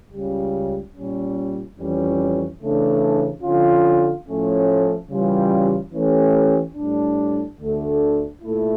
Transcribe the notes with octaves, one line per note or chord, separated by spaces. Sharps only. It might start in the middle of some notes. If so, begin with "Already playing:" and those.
C#2 C#3 G3
A#2 G3 C#4
F2 E3 G3 C#4
C#3 E3 A3 D4
D3 F3 C#4 F4
A2 F3 A3 C#4
C#3 E3 G3 C#4 F4
E3 A3 C#4 G4
A2 G3 D4
D2 D3 A3 D4
A#2 A3 E4